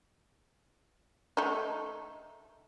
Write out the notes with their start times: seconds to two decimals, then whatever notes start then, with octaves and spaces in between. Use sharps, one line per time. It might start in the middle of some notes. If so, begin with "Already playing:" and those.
1.37 A3 D#4